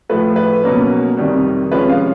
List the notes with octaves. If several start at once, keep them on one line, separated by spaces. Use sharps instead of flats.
A2 F3 A3 B4
B4
B2 F#3 A#3 C#4
F2 C3 D#3 G3
C3 F3 G#3 C#4 B4
F5